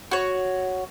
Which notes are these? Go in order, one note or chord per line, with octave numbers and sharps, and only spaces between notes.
F#4 C#5